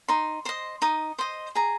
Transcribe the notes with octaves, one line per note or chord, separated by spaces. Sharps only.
D#4 C6
C5 D#5 C6
D#4 D#6
C5 D#5 C6
G#4 A#5